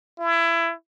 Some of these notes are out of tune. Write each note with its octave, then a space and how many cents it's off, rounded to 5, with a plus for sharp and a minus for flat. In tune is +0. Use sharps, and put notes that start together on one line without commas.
E4 +25